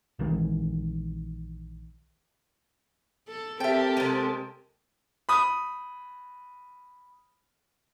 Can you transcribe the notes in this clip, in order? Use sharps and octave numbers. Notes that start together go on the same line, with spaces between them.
A#1 D#3 E3 G#3
A4
C4 G4 A4 A#4 E5 G5 A5
C3 G#3
B5 D#6